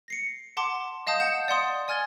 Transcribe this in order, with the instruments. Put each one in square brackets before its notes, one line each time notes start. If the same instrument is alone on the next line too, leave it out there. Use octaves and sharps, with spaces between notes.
[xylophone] A#6 C7 C#7
F#5 A5 C6 D6
D#5 F5 A5 D#6 G6
F#5 G6 C#7 E7
D5 F#5 C6 D#6
D5 G#5 F6 G#6 A6 G7